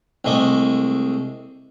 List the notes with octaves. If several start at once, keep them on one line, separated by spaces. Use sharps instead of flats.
C2 G#3 A3 D6